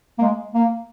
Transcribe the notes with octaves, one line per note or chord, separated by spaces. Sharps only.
A#3
G#3
A#3